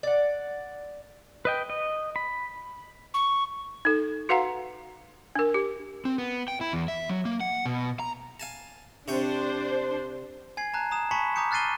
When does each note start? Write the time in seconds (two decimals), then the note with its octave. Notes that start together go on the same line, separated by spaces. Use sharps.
0.03 D5 F#5
1.45 B4 D#5 G5
1.70 D#5
2.16 B5
3.14 C#6
3.85 D#4 A4
4.29 F#4 B4 F5 F#5 A#5
5.35 D4 A#4
5.54 G4
6.05 C4
6.18 B3
6.48 G5
6.61 E4
6.73 E2
6.88 E5
7.09 F#3
7.25 A#3
7.41 F#5
7.66 B2
8.00 A#5
8.40 F5 G#5 A5
9.08 C3 D4 C5 C#5 G5
10.57 G#5 G#6 C7
10.74 A5 A#5 F#6
10.91 A#5 D#6 E7
11.11 G#5 A5 B5 C#6 B6 C#7
11.36 A#5 D6 D#6 G6 C#7
11.51 F6 F#6 A6 C7 D#7 G7